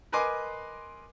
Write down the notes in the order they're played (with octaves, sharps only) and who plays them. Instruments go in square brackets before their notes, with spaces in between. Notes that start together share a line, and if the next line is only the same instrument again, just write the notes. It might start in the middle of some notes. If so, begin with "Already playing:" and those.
[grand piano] A#4 B4 D#5 G#5 C6 D6